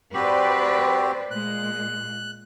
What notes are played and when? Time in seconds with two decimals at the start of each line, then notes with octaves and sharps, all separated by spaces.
0.14 C4 F#4 G4 B4 C5 D5
1.31 A#2 G#3 F#6